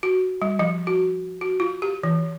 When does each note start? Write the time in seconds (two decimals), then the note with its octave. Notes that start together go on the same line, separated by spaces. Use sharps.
0.03 F#4
0.42 G3
0.59 F3
0.87 F#4
1.41 F#4
1.60 F4
1.82 G4
2.03 E3